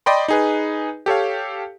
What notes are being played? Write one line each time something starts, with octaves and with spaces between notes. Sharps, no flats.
D5 D#5 G5 B5 C6
D#4 G#4 B4
G4 A4 C#5 F5